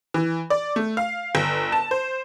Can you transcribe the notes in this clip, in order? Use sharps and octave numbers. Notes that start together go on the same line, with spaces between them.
E3
D5
A3
F5
G1
A5
C5